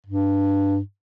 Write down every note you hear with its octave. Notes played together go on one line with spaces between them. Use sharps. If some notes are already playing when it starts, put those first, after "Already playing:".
G2